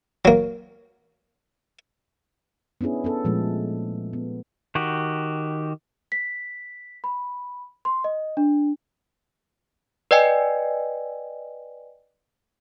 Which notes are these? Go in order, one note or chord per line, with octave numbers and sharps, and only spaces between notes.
F#3 A#3
B3 C#4 D4 E4 G#4
B3 C#4 A4
A#2 F3 G#3 A3
B3
D#3 F#4 G4
B6
B5
C6
D#5
D4
B4 D5 D#5 G5 G#5